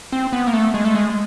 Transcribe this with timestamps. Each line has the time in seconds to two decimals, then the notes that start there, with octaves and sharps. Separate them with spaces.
0.12 C4
0.33 B3
0.47 A#3
0.53 A3
0.74 G#3
0.85 A3
0.95 G#3